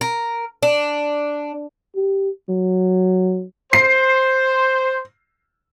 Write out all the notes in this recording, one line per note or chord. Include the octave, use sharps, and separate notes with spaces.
A#4
D4
G4
F#3
C5 C7